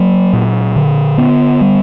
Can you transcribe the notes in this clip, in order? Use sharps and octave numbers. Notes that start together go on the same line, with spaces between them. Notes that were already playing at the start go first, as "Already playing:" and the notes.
Already playing: F#3 A#3
A#2
D3
B3
G3